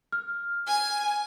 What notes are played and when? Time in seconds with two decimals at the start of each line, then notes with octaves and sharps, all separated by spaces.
0.12 F6
0.67 G#5